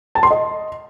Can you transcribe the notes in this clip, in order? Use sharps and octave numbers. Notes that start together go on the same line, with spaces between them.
A5
C6
D#5